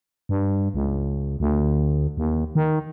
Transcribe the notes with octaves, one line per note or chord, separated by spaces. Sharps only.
G2
C#2
D2
D#2
D#3